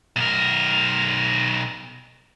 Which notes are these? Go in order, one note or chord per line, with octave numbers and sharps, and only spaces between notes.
B1 A#4